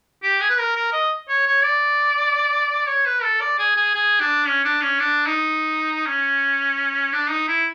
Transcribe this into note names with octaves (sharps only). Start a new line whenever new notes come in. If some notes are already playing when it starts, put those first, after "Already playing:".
G4
G#4
B4
A#4
A#4
D#5
C#5
C#5
D5
C#5
B4
A4
D5
G#4
G#4
G#4
D4
C#4
D4
C#4
D4
D#4
C#4
D4
D#4
E4